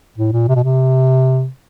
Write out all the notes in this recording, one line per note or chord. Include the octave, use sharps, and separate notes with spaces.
A2
A#2
C3
B2
C3